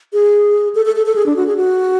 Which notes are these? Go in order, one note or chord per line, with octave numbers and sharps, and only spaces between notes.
G#4
A4
A4
A4
A4
G#4
D4
F#4
G#4
F#4